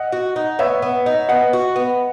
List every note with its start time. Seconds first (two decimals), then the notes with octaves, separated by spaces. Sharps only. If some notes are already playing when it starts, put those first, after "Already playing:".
Already playing: D#5 F#5
0.12 F#4
0.36 D#4
0.59 B3 C#5 E5
0.82 B3
1.06 D#4
1.29 B3 D#5 F#5
1.53 F#4
1.76 B3